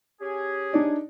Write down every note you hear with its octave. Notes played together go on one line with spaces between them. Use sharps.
C#4 G4 G#4
D4 D#4 D5